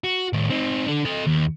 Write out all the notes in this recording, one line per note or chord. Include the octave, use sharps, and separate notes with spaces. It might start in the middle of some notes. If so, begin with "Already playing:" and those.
F#4
A2 D#3
C4 D#4
D4 A4
A4 D#5
D#2